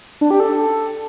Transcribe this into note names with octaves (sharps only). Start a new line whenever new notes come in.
D4
G4
A4